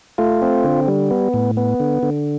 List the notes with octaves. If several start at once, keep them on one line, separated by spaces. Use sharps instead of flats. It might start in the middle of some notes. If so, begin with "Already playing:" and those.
A3 F4
C4
D3
G3
B3
A2
B3
D3
D3